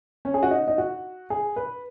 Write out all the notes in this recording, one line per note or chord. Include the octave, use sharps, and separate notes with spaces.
C#4
G#4
F#4
D#4
D#4
F#4
G#4
B4